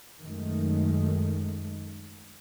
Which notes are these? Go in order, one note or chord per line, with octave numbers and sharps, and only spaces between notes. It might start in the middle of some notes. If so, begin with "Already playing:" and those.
F#2 D#3 G#3 A3